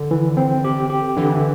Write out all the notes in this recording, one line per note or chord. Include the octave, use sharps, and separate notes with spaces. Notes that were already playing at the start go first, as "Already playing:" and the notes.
Already playing: D3
E3
C4
G4
G4
D3 E3